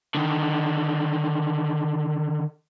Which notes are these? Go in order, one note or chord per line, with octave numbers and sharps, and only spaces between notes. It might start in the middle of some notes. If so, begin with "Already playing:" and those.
D3 D#3